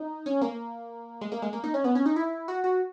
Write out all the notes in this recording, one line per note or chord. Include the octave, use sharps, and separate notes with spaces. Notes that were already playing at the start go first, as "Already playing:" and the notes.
Already playing: D#4
C#4
A#3
G#3
A#3
G#3
A#3
D#4
C#4
B3
C#4
D#4
E4
F#4
F#4